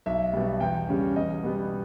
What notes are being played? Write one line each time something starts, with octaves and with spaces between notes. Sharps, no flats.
B1 E5
B2 G3
E2 G5
C#3 G3 C#4
E2 D#5
B2 G3 B3